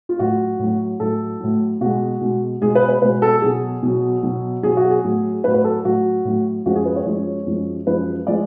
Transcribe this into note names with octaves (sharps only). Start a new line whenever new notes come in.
F4
A2 F#3 F#4
A2 F#3
A2 F#3 A4
A2 F#3
B2 G#3 F#4
B2 G#3
B2 G#3 G#4
B4
B4
B2 G#3 B4
A4
B2 F#3 G#4
B2 F#3
B2 F#3
B2 F#3 G#4
F#4
G#4
A2 F#3
A2 F#3 B4
B4
A4
A2 F#3 F#4
A2 F#3
F#2 F3 G#3 F#4
G#4
B4
C#5
F#2 F3 G#3 C#5
F#2 F3 G#3
F#2 F3 G#3 B4
F3 G#3 D5